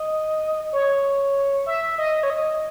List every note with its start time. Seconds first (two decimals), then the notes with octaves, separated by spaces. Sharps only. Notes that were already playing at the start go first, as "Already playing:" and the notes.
Already playing: D#5
0.73 C#5
1.66 E5
1.98 D#5
2.23 C#5
2.30 D#5